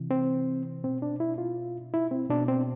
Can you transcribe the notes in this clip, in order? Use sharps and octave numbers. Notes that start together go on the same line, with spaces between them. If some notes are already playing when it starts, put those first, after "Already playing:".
Already playing: C3 E3
C4
B2 C4
D4
E4
F4
E4
C4
B2 D4
C4